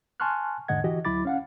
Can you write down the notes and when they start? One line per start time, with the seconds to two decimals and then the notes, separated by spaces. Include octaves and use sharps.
0.20 G#5 A5 C6 C#6 F6 F#6
0.68 E2 G#2 D3 D#5 F#5 G#6
0.84 E3 F#4 G4 D#5
1.05 D2 F#3 E4 B5 D6 A6
1.25 C#4 F5 F#5